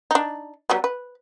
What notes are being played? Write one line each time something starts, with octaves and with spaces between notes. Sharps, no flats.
D4 D#4
F#3 G3 B3
B4